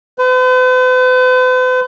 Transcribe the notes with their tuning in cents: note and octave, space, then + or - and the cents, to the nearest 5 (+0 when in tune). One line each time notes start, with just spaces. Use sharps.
B4 +45